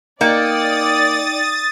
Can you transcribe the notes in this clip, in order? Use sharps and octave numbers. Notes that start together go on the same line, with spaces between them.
A#3 D#4 D5 G5 D#6 A6 C#7